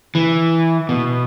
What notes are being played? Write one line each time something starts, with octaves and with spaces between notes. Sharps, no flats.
E3
B2